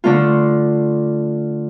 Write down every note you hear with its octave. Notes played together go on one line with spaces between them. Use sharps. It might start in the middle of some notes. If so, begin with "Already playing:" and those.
D3 A3 F4